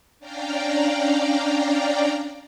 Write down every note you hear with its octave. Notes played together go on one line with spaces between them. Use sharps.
C#4 D4 D5 F5 G5 A#5